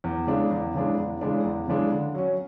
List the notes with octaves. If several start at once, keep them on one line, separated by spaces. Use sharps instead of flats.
E2
C#3 E3 G#3 D4
E2
C#3 E3 G#3 D4
E2
C#3 E3 G#3 D4
E2
C#3 E3 G#3 D4
D3
F#3 C#4